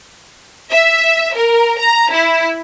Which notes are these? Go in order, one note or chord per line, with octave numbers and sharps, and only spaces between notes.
E5
A#4
A#5
E4